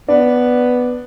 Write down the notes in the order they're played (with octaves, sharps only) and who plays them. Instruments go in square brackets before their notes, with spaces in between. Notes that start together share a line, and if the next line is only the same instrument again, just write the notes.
[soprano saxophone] B3 [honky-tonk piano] D4